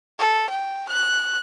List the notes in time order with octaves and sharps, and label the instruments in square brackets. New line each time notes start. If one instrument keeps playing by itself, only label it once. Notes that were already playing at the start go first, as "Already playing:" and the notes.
[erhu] A4
G5
F#6